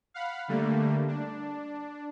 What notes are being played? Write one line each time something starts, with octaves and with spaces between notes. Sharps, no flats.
F5 F#5 B5
D3 G3 A3 A#3
D4